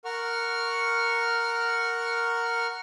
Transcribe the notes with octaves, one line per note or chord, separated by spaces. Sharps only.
A#4 F#5 C#6 F6